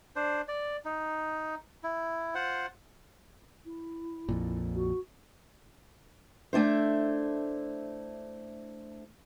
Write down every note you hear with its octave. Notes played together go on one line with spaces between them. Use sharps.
D4 C5
D5
D#4
E4
F4 C5 F#5
E4
A#1 F2 A#2
F#4
A3 D4 E4 C5